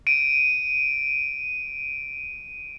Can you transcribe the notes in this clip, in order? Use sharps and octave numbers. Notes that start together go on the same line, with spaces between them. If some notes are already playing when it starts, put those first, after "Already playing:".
D7 D#7